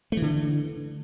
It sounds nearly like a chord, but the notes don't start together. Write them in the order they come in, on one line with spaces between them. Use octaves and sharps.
A3 E3 D3